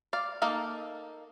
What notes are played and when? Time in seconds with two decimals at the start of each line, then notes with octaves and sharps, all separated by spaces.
0.13 D5 F5
0.42 A#3 D#4 A4 F5